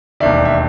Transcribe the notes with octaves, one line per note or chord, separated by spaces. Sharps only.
E1 D#2 D#3 D5 E5
E5